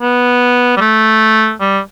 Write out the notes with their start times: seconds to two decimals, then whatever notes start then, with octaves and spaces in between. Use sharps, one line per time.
0.01 B3
0.77 G3
0.81 A3
1.61 G3